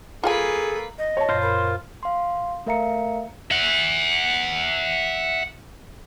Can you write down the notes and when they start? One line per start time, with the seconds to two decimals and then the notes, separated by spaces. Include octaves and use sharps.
0.23 A#3 F4 G#4 A4 B4 F#5 G#5
0.98 D#5
1.17 C#5 A5
1.29 F#2 A#2 F4 C5
1.42 A#4 B5
2.03 F5 C6
2.66 A3 A#4 E5 F5 A#5 C#7
3.51 E5 F#5